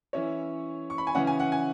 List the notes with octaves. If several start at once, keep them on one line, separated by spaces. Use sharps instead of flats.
E3 C#4 E4 C#5
C#6
B5
G#5
C#3 E3 C#4 F#5
G#5
F#5
G#5